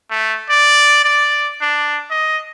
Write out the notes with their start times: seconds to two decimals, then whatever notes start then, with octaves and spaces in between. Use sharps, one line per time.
0.11 A3
0.50 D5
1.04 D5
1.61 D4
2.11 D#5